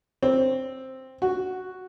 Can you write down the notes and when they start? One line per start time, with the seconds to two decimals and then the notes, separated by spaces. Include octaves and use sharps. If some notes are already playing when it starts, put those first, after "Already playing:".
0.23 C4
1.22 F#4